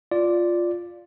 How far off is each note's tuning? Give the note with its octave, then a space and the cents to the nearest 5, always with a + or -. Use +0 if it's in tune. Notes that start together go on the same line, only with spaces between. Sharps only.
F4 +0 D5 +0